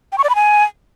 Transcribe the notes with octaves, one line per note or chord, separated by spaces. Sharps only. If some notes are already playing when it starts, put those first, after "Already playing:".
G5
C#6
D5
B5
G#5